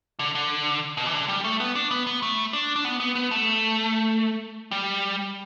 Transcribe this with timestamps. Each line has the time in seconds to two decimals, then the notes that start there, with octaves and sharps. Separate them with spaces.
0.19 D3
0.35 D3
0.97 B2
1.06 E3
1.13 D3
1.28 G3
1.44 A3
1.60 B3
1.75 D4
1.91 B3
2.07 B3
2.22 A3
2.53 D4
2.76 D4
2.85 B3
3.00 B3
3.15 B3
3.31 A3
4.71 G3